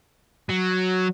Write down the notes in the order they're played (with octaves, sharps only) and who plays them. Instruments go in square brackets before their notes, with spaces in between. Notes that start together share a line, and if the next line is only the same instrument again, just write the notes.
[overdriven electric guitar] F#3